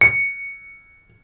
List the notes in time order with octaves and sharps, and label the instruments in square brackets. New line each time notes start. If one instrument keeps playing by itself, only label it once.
[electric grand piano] C#7